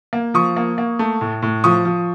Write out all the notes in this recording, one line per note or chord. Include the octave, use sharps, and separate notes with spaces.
A#3
F3 C#6 D#6
A#3
A#3
A3
A2
A2
F3 C#6 D#6
F3